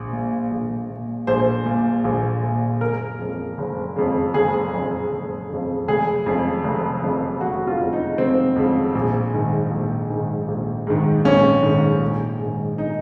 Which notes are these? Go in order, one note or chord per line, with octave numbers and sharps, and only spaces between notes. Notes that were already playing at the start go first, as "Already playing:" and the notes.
Already playing: A#1
A#2
A#1
A#2
A#1 C5
A#2
A#1
A#2
F#1 A#4
F2 C#3
F#1
F2 C#3
F#1 G#4
F2 C#3
F#1
F2 C#3
F1 G#4
F2 C#3
F1
F2 C#3
F1 F#4
F4
F2 C#3
D#4
F1 C4
F2 C#3
A#1
G#2 D#3
A#1
G#2 D#3
A#1
G#2 D#3
A#1 C#4
G#2 D#3
A#1
G#2 D#3
D#4